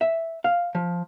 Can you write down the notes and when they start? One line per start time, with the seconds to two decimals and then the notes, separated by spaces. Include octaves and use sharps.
0.01 E5
0.44 F5
0.75 F3